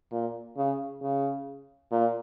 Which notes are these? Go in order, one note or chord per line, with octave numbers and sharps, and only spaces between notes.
A#2
C#3
C#3
A#2